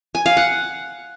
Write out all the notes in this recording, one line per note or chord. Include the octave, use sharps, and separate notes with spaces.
G#5
F5
F#5